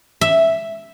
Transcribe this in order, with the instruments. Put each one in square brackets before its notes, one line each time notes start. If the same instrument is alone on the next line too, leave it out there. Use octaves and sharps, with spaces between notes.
[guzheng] E5